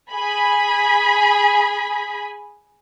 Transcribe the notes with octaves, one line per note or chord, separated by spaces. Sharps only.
G#4 G#5 B5 B6